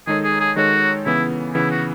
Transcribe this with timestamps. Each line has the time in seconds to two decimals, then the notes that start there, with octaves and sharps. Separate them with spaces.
0.07 D#3 G#3 D#4 G#4 A4 C#5
0.24 G#4
0.40 G#4
0.56 D#3 G#3 D#4 F#4 A4 C#5
1.06 C#3 E3 B3 E4
1.55 C#3 E3 B3 E4
1.71 F#4